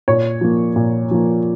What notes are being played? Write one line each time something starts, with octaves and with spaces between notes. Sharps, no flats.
A#2 C#5
F3 A#3
A#2
F3 A#3